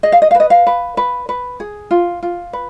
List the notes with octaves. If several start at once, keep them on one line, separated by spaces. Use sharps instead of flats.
G#4 D#5
F5
D#5
F5
B4
D#5
F5
B4
B4
B4
G#4
F4
F4
B4